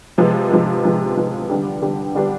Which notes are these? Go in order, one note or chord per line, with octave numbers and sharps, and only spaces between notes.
C3 F3 G#3 B3
C3 F3 G#3 B3
C3 F3 G#3 B3
C3 F3 G#3 B3
D3 G3 B3 D4 G4
D3 G3 B3 D4 G4
D3 G3 B3 D4 G4